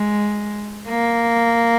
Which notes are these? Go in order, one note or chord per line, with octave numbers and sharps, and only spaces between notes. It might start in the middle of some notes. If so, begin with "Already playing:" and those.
Already playing: G#3
A#3